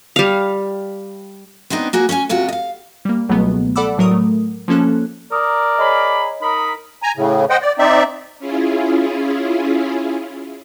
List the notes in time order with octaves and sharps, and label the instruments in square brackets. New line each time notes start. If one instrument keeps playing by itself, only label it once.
[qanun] G3 F5
[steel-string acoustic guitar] B3 C4 D4 D#4
A#3 F#4 G#4
C#4 C#5 F#5 G#5
D2 C3 F4 F#4
D#5 F5
[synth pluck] G3 A#3
C#2 B2 F#3 G3 A3 B3
A4 D5 F#5 B5 D6 E6
A2 F#3 A#4 D#6
A3
F3 A#3 C#4 A4 F#6
[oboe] A#4 [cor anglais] D5 [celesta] A#5 D#6
[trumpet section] G#4 A#5 B5 [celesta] C#5 D#5
[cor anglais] D#4 [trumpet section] A#4 B5
[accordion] G#5 A#5
A2 C#3
C5 D#5 F#5 G5
D5
C4 D#4 D5 E5
[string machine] C#4 E4 F4 G#4